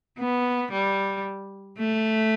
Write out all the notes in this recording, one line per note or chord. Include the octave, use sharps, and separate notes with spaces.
B3
G3
A3